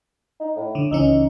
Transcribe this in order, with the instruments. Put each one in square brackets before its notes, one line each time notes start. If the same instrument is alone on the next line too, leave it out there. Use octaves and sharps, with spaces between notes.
[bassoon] D#4
A2
[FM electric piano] D3
[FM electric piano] C#2 E3 C#4 [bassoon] D#4